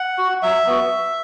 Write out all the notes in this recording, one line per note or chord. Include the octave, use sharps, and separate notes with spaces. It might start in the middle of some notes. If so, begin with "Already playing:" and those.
Already playing: F#5
F#4
F#3 E5
B3 F#4